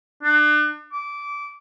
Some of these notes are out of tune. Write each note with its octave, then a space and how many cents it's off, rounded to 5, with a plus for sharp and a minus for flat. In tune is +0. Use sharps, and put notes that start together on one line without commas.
D4 +40
D6 -20